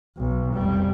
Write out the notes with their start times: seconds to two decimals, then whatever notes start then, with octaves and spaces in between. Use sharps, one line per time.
0.17 B1
0.54 F1 G3